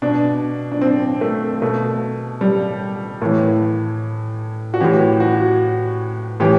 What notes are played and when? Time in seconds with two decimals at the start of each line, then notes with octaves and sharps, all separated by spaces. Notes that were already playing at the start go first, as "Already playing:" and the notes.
0.02 B2 D4
0.72 D4
0.81 C4
1.21 A3
1.62 B2 A3
2.41 G3
3.22 A2 E3 A3
4.74 F#4
4.80 A2 E3 G4
5.20 F#4
6.40 A2 E3 G4